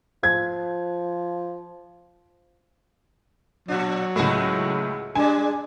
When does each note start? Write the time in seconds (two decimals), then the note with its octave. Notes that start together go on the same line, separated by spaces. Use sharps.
0.23 F3 G#6
3.68 A#2 F#3 D4
4.16 C#2 A2 G#3 F#4 G#4
5.15 G3 G#3 D4 G#5